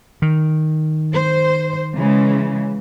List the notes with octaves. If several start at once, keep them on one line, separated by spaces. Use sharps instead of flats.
D#3
C5
C#3 E3 G#3